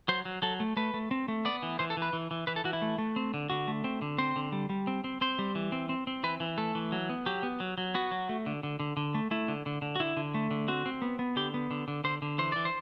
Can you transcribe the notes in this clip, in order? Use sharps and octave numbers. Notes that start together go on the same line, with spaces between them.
F#3 C5
F#3
F#3 A4
A3
A3 B4
A3
C4
A3
B3 D5
E3
E3 C5
A4
E3
B4
E3
E3
E3 B4
A4
E3 F#4
E4
A3
A3
C4
D3
D3 F#4
A3
C4
D3
C4 C5
D3
G3
G3
C4
C4
C4 C5
G3
E3
C4
C4
C4
E3 B4
E3
A3 A4
E3
F#3
B3
F#3 G4
B3
F#3
F#3
B3 F#4
F#3
A3
D3
D3
D3
D3
A3
A3 E4
D3
D3
D3
F#4
D3 E4
D3
A3
D3
C4 F#4
C4
B3
B3
D3 G4
B3
D3
D3
D3 C5
D3
E3 C5
E3 D5
C5